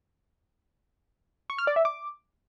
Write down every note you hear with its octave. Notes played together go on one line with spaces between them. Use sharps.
C#6
F6
D5
E5
D6